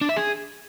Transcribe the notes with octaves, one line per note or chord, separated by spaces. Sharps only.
D4
E5
G#4